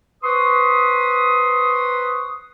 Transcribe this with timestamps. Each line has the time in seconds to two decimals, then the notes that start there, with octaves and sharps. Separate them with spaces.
0.23 B4 C5 C6 C#6 D#6